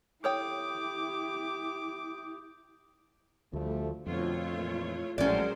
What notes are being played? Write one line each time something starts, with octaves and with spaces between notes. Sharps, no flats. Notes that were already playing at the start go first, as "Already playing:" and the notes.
E4 G4 A4 C#5 G5 D6 D#6 G6
D2 F3 G3 A3
F2 B2 D3 A3 F4 C#5
A#2 E3
A#1 A2 F#3 G#3 C#4 A#4 C5 D5